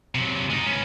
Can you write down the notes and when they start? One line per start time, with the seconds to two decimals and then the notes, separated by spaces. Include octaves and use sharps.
0.15 C3 F#3
0.50 G#3 D#4
0.66 B3 C#4